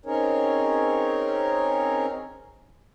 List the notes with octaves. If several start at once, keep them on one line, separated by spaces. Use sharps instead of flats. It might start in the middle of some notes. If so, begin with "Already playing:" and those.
C4 C#4 D#4 G#4 A#4 C#5